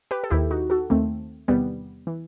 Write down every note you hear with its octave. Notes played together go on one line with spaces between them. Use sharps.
G4 B4
A4
D#2 D#3 E4 G4
D#4 F#4
F#4 A4
D#2 D#3 A3 C4
E2 C3 D#3 G3 B3
E3